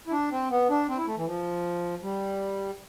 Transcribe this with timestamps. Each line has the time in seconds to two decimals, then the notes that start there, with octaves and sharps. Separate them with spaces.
0.07 E4
0.12 D4
0.31 C4
0.51 B3
0.70 D4
0.89 C4
0.98 E4
1.07 A3
1.17 E3
1.27 F3
2.03 G3